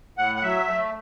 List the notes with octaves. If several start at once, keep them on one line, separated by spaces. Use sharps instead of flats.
A2 F#5
F#5
F#3 E5
A3